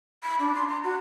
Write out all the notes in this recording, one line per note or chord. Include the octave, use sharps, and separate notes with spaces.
B5
D4
C6
A#5
F#4